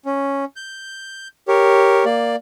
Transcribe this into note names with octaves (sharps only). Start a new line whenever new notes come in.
C#4
G6
G4 A#4 C#5
A#3 D5